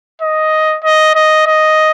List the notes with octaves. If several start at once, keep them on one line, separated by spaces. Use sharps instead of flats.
D#5
D#5
D#5
D#5